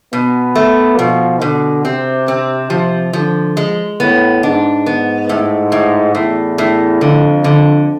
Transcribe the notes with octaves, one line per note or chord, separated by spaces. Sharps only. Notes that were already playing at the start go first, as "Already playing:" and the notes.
B2 B3
A3
B2 F3
B2 D3
C3 C4
C4
C3 F3
D3 F3
G#3
A2 B3
G#2 D4
B3
A2
A2
E2 A2
A2
F2 D3
D3